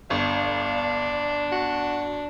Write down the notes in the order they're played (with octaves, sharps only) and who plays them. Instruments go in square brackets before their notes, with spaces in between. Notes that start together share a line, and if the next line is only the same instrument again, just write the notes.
[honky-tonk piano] G1 [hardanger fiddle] D4 [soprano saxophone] F5
[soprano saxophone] F#4